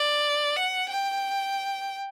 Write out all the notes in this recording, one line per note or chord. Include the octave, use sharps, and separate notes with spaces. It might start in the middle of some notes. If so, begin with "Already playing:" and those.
Already playing: D5
F#5
G5